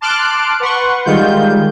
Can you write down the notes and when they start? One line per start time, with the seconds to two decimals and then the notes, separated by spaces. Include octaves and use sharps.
0.01 A5 C6 D6 F6 F#6 D7
0.60 B4 F#5 C6 C#6
1.05 D#3 G3 G#3 F4 G6